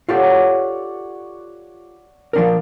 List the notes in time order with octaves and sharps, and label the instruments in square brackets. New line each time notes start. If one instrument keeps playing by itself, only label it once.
[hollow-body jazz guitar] F4 G4 A4 [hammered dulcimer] C#5 D5 F#5
[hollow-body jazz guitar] F3 D4 A#4